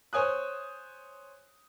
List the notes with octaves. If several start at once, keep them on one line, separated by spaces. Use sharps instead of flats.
C5 C#5 G#5 D#6 F#6